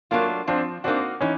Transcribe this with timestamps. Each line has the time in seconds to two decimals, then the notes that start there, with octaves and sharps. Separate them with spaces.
0.11 F#3 A3 A#3 D4 F4
0.47 F3 C4 D4
0.84 A#3 C4 D4 D#4 F#4
1.21 E3 C#4 D#4